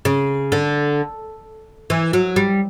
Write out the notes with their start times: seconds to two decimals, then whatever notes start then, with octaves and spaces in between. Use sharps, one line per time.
0.05 C#3
0.52 D3
1.90 E3
2.13 F#3
2.36 G3